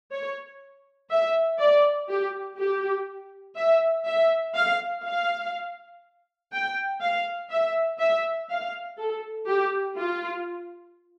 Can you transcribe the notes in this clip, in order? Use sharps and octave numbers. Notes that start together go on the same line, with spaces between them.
C#5
E5
D5
G4
G4
E5
E5
F5
F5
G5
F5
E5
E5
F5
A4
G4
F4